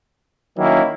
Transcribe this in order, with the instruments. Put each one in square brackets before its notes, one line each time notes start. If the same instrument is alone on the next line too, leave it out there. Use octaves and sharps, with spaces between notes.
[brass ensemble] D#3 F#3 A#3 C#4 E4